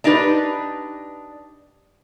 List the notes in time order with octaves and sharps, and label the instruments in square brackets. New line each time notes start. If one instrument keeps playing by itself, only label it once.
[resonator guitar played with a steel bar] D4 D#4 G4 G#4 B4